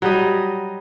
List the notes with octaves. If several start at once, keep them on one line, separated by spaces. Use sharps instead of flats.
F#3 G3 D#5